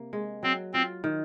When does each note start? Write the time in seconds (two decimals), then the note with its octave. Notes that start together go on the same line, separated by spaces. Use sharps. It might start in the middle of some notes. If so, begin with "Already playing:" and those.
Already playing: C3 A#3
0.13 G#3
0.43 F#3 C4
0.73 C4 F4
1.04 D#3